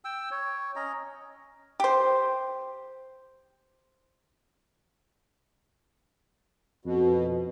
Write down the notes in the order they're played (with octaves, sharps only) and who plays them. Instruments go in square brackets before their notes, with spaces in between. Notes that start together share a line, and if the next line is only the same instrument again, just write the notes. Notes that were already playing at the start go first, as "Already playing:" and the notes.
[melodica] G5 E6
C#5
C#4 D#5 A#5
[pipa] G4 C5
[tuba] F2 [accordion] B2